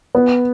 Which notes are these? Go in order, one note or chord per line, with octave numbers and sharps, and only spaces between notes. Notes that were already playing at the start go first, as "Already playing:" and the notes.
B3